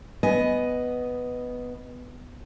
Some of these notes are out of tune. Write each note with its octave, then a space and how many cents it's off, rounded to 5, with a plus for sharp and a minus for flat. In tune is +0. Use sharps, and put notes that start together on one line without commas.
B3 +0 D#5 +0 G#5 +0